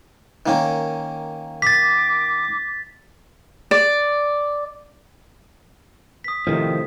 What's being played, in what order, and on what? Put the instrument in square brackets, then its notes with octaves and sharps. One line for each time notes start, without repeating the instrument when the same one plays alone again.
[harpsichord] D#3 A#3 C#4
[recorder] D6 [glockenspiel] A6 B6
[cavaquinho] D5
[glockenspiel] D#6 B6
[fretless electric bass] A2 C3 [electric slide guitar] D#3 F3